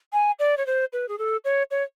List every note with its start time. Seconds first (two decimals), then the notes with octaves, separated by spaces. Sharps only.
0.13 G#5
0.39 D5
0.57 C#5
0.66 C5
0.93 B4
1.08 G#4
1.18 A4
1.45 C#5
1.71 C#5